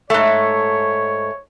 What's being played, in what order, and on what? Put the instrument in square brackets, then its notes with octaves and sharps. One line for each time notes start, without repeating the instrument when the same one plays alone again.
[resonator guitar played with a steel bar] G#2 A3 [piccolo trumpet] C#5